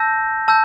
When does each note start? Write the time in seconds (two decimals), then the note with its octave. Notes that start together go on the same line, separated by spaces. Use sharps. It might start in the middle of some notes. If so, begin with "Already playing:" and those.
Already playing: A5 E6 G6 A#6
0.48 A5 E6 G6